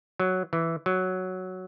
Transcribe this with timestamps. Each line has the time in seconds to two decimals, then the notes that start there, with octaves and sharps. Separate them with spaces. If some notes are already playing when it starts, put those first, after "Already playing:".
0.20 F#3
0.53 E3
0.86 F#3